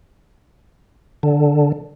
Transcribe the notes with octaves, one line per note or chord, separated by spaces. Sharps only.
D3